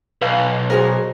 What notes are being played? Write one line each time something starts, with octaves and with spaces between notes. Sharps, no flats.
B1 B4 F5
F#4 G#4 A#4 C5